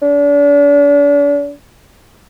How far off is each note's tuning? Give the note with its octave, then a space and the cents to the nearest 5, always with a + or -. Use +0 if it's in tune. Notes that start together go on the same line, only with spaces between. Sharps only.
D4 -40